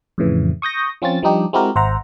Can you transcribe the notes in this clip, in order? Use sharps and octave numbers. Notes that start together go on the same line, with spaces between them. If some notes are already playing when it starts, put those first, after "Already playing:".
F2 A2 C#3 E3
C#6 D#6 G6 A#6
F3 C4 C#4 F4 A6
F3 G3 D4 D#4 G4
G#3 C4 E4 F#4 G4 A#4
G#1 C5 E5 F#5 A#5